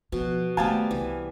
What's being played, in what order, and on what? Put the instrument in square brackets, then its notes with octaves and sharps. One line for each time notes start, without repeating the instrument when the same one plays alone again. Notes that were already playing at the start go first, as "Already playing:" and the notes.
[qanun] B2 [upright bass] F3
[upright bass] D#3 A3 [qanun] G3 B3 C5 [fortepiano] F5 G#5 A5
[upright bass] C2 [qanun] E3